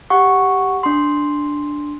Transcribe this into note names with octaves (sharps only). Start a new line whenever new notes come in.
G4 F#5 C#6
D4 C6